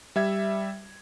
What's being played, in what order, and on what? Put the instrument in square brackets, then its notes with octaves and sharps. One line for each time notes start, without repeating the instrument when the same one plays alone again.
[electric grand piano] G3 E5 G#6